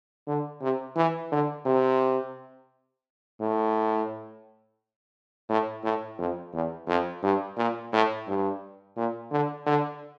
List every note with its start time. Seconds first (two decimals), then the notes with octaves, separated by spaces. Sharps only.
0.27 D3
0.61 C3
0.96 E3
1.32 D3
1.66 C3
3.40 A2
5.49 A2
5.84 A2
6.18 F2
6.53 E2
6.87 F2
7.23 G2
7.57 A#2
7.92 A2
8.28 G2
8.97 A#2
9.31 D3
9.66 D3